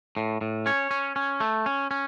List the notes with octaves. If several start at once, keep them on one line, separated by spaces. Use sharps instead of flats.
A2
A2
C#4 C#5
C#4
C#4
A3
C#4
C#4